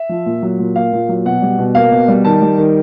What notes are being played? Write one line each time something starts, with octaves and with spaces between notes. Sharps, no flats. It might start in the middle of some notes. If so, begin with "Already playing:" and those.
Already playing: E5
F3
A#2
F#3
A#2
A#3 F5
A#2
F#3
B2 F#5
G3
B2
A#3 F5
B2
G3
D#3 A5
G3
D#3